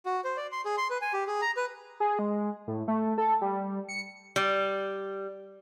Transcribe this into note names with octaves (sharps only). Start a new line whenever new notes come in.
F#4
C5
D5
C6
G#4
C6
B4
G#5
G4
G#4
A#5
B4
G#4
G#3
A2
A3
A4
G3
C#7
G3